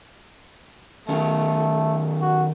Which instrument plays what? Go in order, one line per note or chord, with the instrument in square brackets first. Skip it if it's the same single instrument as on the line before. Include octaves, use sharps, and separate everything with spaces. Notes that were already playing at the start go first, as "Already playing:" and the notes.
[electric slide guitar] D#3 F#3 C#4 [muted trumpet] A3
[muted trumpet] F#4